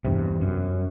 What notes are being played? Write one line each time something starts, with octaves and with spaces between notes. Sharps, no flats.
E2 G2 C3
F#2